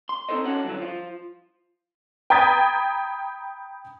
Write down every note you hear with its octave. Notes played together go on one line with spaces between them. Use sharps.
C6
C4 D#4 G4 A4 C5 D#5
C#4 F#4 A4 F#5
G2 D3 E3 F#3
F3 F4
G5 A#5 B5 D#6 G#6 A6